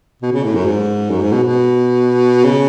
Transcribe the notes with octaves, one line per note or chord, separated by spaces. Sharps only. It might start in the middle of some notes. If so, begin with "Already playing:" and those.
B2
C#3
A2
F#2
G#2
F#2
G#2
B2
B2
C#3